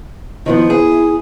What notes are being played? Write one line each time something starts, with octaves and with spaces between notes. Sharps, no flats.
D#3 F3 B3 E4
G#4